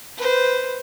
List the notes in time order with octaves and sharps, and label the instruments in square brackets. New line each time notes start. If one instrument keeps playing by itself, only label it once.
[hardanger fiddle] B4 C5